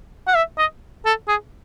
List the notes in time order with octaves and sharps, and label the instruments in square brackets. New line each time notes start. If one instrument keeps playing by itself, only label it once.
[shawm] F#5
E5
D#5
A4
G#4